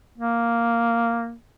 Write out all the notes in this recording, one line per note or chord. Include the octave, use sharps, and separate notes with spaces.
A#3